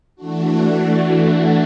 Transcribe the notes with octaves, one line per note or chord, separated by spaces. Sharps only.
E3 A3 D4 F#4